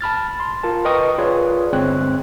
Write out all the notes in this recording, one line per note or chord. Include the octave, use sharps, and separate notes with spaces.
A5 B5 F6 A6
C6
F4 A#4 A5
A#4 B4 D#5 G5 C#6 D#6
F4 G#4 B4 C#5 D5
G1 G#3 C4 C#5 F#6